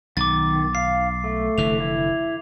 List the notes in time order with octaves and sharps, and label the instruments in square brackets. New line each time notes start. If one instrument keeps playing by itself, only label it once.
[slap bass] B1 [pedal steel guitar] D#3 [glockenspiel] D6 A6
[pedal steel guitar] F5 [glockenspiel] C7
[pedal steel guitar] A3
[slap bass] F1 D3 E3 [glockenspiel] F7
[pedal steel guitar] E4